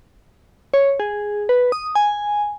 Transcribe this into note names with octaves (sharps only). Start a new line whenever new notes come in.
C#5
G#4
B4
D#6
G#5